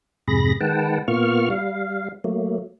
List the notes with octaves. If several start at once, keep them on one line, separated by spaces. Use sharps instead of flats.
F2 G#2 C3 G#4 B5 A#6
D#3 G#3 B4 F#5 G5 A5
A#2 A#3 B3 F4 C#6 F6
G3 F5
F#3 A3 A#3